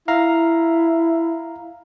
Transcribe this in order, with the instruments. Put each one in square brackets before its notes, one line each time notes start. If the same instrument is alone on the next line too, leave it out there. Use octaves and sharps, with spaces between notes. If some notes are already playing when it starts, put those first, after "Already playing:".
[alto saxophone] E4 [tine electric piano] F5 A#5